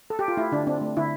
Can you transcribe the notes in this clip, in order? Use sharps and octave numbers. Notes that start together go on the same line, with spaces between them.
A4
G4
F4
A3 E4
D3 D4
C4 D4
A3
D3 E4